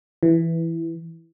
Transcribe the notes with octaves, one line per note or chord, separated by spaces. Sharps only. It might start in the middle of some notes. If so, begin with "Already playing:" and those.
E3